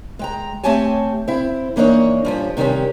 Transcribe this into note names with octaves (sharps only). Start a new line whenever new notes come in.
G#3 G5 A#5
A3 C4 G4 C#5 G#5 A5
C4 E4
E3 A#3 D4 D#4 C#5
G2 F3 C#4
C3 D#3 G3 B3 C#4